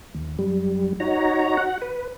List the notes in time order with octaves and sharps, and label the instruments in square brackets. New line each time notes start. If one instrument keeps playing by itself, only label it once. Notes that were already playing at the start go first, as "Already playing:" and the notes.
[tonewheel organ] D#2
F#2 G3
D#4 F#4 C#5 A#5
F#4 F#5
B4